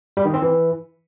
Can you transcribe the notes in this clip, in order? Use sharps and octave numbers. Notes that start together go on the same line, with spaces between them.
G3
D#3
C4
E3